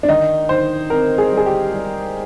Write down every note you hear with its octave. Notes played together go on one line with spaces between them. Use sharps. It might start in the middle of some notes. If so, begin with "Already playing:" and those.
D4
D#3 D#4
D#3 C5
C4 A#4
G#4
G3
G#4
G4
G3